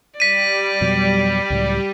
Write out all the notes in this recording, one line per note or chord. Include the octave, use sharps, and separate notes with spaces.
G3 D5 B6 D#7
F2 B2 F#3
C#2 A2 F#3